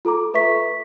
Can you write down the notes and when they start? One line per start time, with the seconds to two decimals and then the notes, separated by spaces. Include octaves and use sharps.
0.05 F4 A4 A#5 D6
0.34 A4 B4 E5 C#6 B6